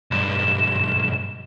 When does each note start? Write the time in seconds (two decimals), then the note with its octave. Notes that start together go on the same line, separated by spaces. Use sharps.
0.11 B1 G2 E7